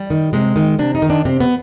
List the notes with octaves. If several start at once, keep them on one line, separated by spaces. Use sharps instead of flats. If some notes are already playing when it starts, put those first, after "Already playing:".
Already playing: G3
D#3
C3 G#3
D#3
C3 D4
D#4
D#3
D4
C3 C4
B3